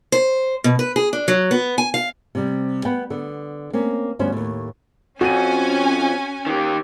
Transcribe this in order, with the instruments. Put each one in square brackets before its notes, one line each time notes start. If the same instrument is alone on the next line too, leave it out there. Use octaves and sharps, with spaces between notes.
[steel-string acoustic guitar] C5
B2
B4
G#4
D4
F#3
B3
G#5
F5
[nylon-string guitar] C3 G3 C4
B3 F#5 G5
D3 B3
A#3 C4 C#4
D2 G2 B3 C#4 C5
D#2 A2
[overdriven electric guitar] F2 [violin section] C#4 G#5 [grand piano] F#4 D#7
[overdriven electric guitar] D#3 G4